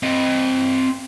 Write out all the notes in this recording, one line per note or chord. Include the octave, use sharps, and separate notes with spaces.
C4 D#5